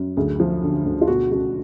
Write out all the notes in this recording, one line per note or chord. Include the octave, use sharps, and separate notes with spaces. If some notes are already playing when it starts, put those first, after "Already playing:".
Already playing: F#2
D2 G#4
F3
D3
D2
F4
B2 F#4
C#2 F#4